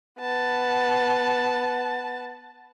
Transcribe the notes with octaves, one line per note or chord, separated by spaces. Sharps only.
B3 A5